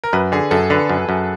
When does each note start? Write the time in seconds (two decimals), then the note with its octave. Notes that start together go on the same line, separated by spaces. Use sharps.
0.04 A#4
0.13 F#2 B4
0.32 D3 G#4
0.51 F#2 A4
0.70 D3 B4
0.89 F#2
1.09 F#2